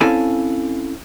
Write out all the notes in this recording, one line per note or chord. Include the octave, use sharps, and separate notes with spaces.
C4 C#4 E4 A4 F5 G#5